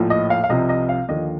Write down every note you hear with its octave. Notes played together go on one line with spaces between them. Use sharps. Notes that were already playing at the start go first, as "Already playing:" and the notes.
Already playing: A#1 A2 F3
D#5
F5
F5
C2 C3 F3 D#5
D#5
F5
D#2 D3 F3 D#5